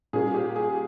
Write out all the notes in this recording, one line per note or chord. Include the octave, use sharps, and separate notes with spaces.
A#2 G3 A#3 C#4 G#4
G4
G#4